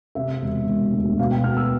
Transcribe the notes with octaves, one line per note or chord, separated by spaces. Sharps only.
C3 E5
E1
E1
D2
B2 F5
G5
B3 F6
E6